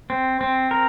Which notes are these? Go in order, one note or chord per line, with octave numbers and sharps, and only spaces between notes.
C4
C4
A#4